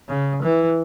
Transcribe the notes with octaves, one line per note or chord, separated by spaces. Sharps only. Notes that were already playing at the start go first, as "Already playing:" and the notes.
C#3
E3